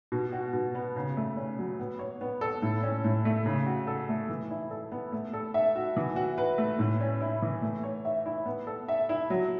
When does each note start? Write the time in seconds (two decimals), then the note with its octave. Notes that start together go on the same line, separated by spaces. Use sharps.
0.12 B2
0.32 F#4
0.53 B2
0.75 B3
0.96 C#3
1.17 A3
1.37 C#4
1.59 F#3
1.79 B3
1.99 C#5
2.21 B3
2.41 A4
2.62 A2
2.83 C#4
3.04 A2
3.25 A3
3.46 C#3
3.66 F#4
3.87 A4
4.09 A3
4.29 E3
4.51 E4
4.71 A4
4.92 B3
5.12 A3
5.34 A4
5.54 E5
5.75 F#4
5.97 E3
6.16 F#4
6.38 B4
6.58 A3
6.79 A2
7.01 C#4
7.21 E4
7.42 E3
7.62 A3
7.83 C#5
8.05 E5
8.26 E4
8.46 B3
8.67 A4
8.88 E5
9.09 E4
9.30 F#3